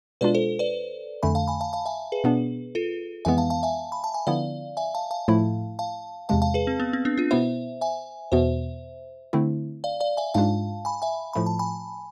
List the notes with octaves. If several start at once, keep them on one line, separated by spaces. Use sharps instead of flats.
B2 G#3 D4 F4 B4 D5
A4 C5
B4 D5
F2 D3 A3 G#5 B5
F5 A5
G#5 B5
F5 A5
F5 A5
E5 G#5
G#4 B4
B2 B3 D4
F4 A4
F2 E3 G#3 B3 E5 G#5
F5 A5
F5 A5
E5 G#5
B5
A5
G#5
D3 F3 B3 E4 D5 F5
E5 G#5
F5 A5
F5 A5
A2 F3 A3 E4
F5 A5
E2 C3 G#3 F5 A5
F5 A5
G#4 B4
C4
B3
C4
B3 D4
D4 F4
B2 B3 E4 C5 E5
E5 G#5
E2 B2 B3 C5 E5
D3 A3 C4 E4
D5 F5
D5 F5
E5 G#5
G#2 G#3 D4 F4 F5 A5
G#5 B5
E5 G#5
A2 F3 A3 B5
A5
G#5 B5